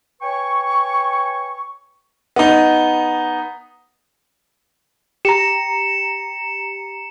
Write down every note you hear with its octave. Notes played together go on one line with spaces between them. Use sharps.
B4 C#5 G5 G#5 C#6
B3 D#4
G4 A#5 C#7 E7